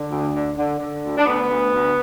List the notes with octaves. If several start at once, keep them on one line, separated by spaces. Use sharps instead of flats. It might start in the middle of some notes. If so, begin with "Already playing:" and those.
Already playing: D3
D2
D3
D3
D3
D2
D4
D2 B3
D2
D2